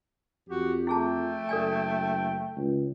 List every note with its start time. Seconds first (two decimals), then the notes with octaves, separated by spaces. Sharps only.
0.49 F2 F#4 G4
0.87 A3 E4 G#4 G5 A5
1.49 F#1 A4 D5 G#5
2.57 C#2